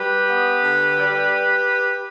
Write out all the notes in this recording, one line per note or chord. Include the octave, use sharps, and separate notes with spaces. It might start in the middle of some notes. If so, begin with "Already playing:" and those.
Already playing: G3 G4 B4
B3
D3
G3